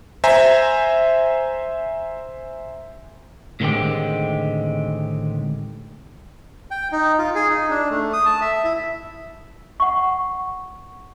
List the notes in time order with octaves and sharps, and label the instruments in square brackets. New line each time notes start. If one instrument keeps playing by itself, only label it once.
[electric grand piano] C5 E5 G#5 A#5
[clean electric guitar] A2 D3 D#3 G#3 C4 G4
[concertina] G5
D#4
F4
G#4
D#4
D4
A3
D#6
A5
E5
E4
[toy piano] F#5 C#6